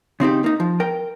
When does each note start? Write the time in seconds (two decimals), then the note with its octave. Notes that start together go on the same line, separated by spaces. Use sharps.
0.20 C#3 C4 D#4 G4
0.44 A#3 D#4
0.60 F3
0.80 A#4 G5